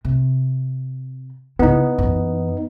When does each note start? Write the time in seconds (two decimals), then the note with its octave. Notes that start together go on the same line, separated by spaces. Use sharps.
0.05 C3
1.59 C#3 B3 D#4 E4
1.98 F#2 E3